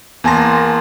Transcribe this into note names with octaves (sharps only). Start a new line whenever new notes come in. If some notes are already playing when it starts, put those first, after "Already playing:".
E2 A#3 G#5 A5 C6 A#6